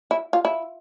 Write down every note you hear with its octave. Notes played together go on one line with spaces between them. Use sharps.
E4
F4
E4